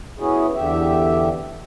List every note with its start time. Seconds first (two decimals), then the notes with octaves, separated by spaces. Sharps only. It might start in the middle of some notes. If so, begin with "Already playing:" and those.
0.19 B3 C#4 E4 F#4 G#4
0.55 E2 D3 G4 E5